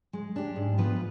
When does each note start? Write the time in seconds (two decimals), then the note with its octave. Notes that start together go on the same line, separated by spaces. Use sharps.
0.13 G#3
0.36 D4 G4
0.56 G#2
0.78 F3 B3 F4 B4